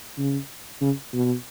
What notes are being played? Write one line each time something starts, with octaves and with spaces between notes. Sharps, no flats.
C#3
C#3
B2